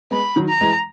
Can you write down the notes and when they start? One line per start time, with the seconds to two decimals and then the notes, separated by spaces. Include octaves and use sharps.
0.11 G#3 B3 B5
0.36 D#3 F#3
0.49 A#5
0.61 E3 G#3